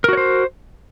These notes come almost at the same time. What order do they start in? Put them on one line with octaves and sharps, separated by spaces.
A#4 F#4 C#5 C5